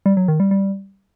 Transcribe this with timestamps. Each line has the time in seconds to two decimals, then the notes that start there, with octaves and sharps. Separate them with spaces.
0.06 G3
0.17 F#3
0.28 D#3
0.40 G3
0.51 G3